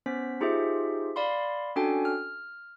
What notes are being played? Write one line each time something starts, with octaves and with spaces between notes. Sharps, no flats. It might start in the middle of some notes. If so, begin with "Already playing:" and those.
B3 C#4 C5 B6
D#4 F4 G4 G#4 C5 E5
D5 F5 B5 C6
C#4 D4 F#4 A4 G5 G#5
F6